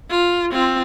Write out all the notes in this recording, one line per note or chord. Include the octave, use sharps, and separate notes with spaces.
F4
C4 F4